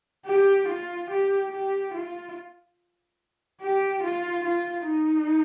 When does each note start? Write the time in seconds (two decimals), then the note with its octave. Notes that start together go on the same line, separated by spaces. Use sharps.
0.26 G4
0.68 F4
1.10 G4
1.52 G4
1.94 F4
3.61 G4
4.03 F4
4.45 F4
4.86 D#4